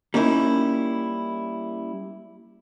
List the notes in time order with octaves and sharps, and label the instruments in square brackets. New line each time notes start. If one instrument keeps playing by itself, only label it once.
[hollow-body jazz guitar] G3 A#3 C#4 D#4 E4